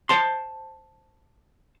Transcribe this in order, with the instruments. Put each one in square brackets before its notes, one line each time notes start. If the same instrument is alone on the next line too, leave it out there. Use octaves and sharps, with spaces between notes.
[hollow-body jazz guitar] C5 A5 C6